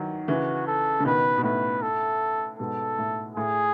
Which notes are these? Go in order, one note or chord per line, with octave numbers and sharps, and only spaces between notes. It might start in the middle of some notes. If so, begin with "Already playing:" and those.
Already playing: D#3 E3 F#3
C#3 E3 F#4
A4
C#3
B2 D#3 B4
B2
A2 B4
A4
G#2 B2 A4
A2
A2 G#4